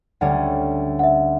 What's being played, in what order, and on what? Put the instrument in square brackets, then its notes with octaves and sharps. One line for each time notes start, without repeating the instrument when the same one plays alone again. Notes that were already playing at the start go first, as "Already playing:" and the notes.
[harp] D2 D3 G3 C#4 [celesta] F#5
[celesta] F#5
E5